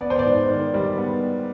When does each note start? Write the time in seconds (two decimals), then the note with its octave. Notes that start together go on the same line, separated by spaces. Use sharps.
0.01 B3 D5
0.10 C5
0.19 D5
0.25 G#2
0.49 D#3
0.73 G3 D5
0.98 B3